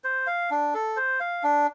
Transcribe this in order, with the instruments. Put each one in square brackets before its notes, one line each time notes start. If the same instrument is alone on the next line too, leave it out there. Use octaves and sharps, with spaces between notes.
[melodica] C5
F5
D4
A4
C5
F5
D4